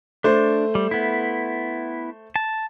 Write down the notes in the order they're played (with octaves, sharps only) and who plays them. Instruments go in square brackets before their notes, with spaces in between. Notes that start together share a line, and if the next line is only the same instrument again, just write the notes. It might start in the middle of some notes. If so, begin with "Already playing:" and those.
[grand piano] A3 C5 [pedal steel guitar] D4
[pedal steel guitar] G3
B3 E4
A5